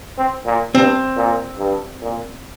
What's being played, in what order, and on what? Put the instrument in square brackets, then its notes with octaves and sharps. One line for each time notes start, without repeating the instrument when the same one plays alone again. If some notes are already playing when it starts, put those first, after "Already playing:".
[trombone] C4
A#2
[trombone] G2 [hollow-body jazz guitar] C4
[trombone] A#2
G2
A#2